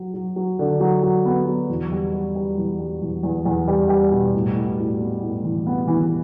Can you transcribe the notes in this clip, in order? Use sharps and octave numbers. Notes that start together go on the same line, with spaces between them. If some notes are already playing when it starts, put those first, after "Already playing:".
Already playing: F#3 F#4
F#3
F#3
D3
F#3
F#3
B3
F#3
E2
G3
G3
G3
E2
G3
E2
E2
E2
G3
G3
B2
A2
A2
A2
B3
A2
E3
B3
E3